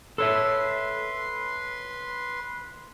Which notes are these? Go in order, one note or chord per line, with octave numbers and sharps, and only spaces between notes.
A4 B4 C#5 E5 C6